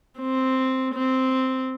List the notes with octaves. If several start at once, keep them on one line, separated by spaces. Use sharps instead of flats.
C4
C4